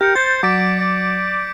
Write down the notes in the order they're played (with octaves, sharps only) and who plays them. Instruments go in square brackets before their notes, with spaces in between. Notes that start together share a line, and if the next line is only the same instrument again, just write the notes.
[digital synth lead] G4 [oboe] A#4 [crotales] G6 C#7
[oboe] C5 [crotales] G#6 C#7 [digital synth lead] A6
[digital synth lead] F#3 [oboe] D5 [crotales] D6 B6 D7
[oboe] D5